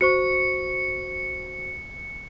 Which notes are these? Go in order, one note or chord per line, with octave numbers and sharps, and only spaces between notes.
F#4 C5 C#6 C#7